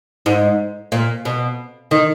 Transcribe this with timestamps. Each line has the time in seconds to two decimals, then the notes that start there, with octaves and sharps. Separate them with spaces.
0.26 G#2
0.92 A#2
1.25 B2
1.91 D#3